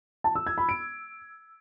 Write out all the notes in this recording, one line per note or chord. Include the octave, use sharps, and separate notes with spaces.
A5
E6
G#6
B5
D7